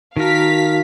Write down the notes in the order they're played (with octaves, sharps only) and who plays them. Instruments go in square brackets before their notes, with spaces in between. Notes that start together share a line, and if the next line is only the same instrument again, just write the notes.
[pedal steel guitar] D#3 A#4 [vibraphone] F#4 A5 [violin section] F5 B6